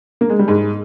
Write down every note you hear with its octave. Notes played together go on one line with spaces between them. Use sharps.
A#3
G#3
G3
G#2 G#3